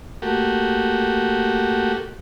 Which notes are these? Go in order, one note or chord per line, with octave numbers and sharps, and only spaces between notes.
A3 A#3 F#4 G4